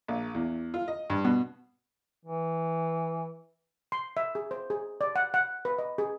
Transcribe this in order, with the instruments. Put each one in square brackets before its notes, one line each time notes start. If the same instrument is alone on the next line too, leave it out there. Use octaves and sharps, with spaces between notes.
[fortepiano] A#1
E2
F4
D#5
G2
B2
[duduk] E3
[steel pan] C6
E5
G#4
C5
G#4
D5
F#5
F#5
B4
D#5
G#4